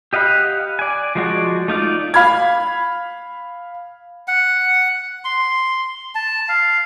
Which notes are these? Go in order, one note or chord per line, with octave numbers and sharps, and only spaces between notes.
G4 D#5 F5 F#5 B5
D5 G#5
F3 G#3 F#4 D5
A3 D#4 F4 D5
F5 B5 F6 G#6
F#5
C6
A5
F5